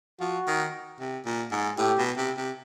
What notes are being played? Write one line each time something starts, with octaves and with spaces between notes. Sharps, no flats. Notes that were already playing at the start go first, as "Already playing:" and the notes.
F3 F#4
D#3
C3
A#2
G#2
A2 G4
B2
C3
C3